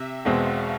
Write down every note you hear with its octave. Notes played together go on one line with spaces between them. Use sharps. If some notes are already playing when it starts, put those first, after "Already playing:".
Already playing: C3 E5
E2 B2 G#3 C4 F5